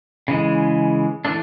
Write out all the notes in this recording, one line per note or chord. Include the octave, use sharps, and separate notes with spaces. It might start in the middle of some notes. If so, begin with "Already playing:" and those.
C#3 E3 G#3
E3 A3 D4